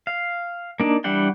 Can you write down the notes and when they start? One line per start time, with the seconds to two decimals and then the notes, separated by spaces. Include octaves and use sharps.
0.07 F5
0.80 A#3 D4 D#4
1.04 E3 G3 D4 F#5 G5